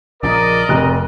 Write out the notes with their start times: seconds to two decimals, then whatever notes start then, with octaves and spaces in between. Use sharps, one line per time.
0.23 A#1 C#3 F3 A#4 D5 D#5
0.69 F1 C#3 C4 F#6